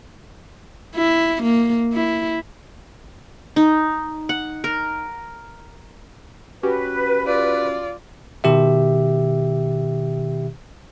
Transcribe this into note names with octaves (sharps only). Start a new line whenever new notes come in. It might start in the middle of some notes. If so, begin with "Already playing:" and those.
E4
A#3
E4
D#4
F#5
A#4
C#4 F#4 G4 B4
F4 D5
B2 D#3 G4 E5